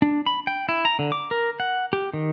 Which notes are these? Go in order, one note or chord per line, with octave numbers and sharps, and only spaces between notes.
D4
B5
G5
E4
A#5
D3
D6
A#4
F#5
G4
D#3